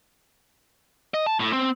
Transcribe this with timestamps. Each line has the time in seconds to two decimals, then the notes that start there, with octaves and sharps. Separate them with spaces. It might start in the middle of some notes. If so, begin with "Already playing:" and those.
1.14 D#5
1.27 A5
1.40 A2
1.53 C4